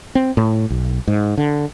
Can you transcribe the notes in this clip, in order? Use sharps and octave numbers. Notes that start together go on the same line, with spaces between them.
C4
A2
B1
G#2
D3